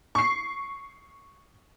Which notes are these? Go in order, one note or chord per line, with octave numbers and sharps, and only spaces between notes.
C#6 C7